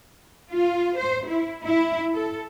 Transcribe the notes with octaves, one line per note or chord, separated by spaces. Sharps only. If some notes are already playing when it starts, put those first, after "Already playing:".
F4
C5
E4
E4
A4